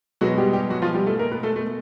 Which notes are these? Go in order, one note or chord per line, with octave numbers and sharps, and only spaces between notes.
B2 F#3 G#3 B3 F#4
G3 G4
G3 G4
F#3 F#4
F3 F4
G3 G4
A3 A4
A#3 A#4
B3 B4
A3 A4
A3 A4